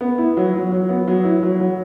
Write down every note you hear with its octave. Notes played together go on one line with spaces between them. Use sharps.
B3
E4
F#3
F#3
F#3
B3
F#3
E4
F#3
F#3